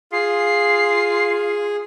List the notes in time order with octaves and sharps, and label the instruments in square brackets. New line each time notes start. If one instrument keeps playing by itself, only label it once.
[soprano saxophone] F4 [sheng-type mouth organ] G#4 [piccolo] C7